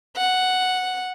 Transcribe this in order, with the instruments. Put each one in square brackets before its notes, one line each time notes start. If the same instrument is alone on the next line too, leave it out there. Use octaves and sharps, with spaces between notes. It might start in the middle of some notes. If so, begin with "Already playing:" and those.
[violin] F#5